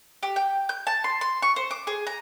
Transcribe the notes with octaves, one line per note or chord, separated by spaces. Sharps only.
G4
G5
G6
A5
C6
C6
C#6
C5
D6
G#4
A#5